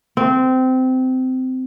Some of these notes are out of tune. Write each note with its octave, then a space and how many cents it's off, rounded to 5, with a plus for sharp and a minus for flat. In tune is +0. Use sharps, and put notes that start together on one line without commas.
C4 -20